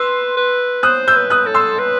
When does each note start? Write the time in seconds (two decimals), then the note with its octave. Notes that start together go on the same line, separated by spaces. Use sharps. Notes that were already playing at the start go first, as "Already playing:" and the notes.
Already playing: B4 C6 E6
0.37 B4
0.83 C5 D#6 F#6
1.08 E6 G6
1.16 B4
1.30 D#6 F#6
1.46 A4
1.54 C6 E6
1.79 B4